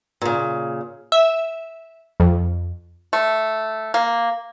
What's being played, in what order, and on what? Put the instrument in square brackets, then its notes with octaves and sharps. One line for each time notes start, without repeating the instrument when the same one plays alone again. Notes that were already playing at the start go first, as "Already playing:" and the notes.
[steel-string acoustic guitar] A#2 C#3
[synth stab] E5
F2
[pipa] A3
A#3